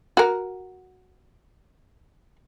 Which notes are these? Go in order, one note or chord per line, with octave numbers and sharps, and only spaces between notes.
F#4 A#4